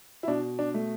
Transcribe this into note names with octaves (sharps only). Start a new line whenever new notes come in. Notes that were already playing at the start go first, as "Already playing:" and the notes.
E4
B2 D4
D4
A3